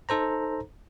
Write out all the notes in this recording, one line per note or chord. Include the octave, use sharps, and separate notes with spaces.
D#4 A4 C5 A#5